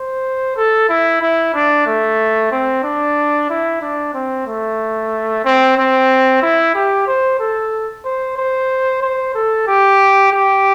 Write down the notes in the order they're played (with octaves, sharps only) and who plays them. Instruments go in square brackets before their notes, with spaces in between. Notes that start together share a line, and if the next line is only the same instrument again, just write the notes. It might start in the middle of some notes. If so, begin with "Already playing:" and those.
Already playing: [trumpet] C5
A4
E4
E4
D4
A3
C4
D4
E4
D4
C4
A3
C4
C4
E4
G4
C5
A4
C5
C5
C5
A4
G4
G4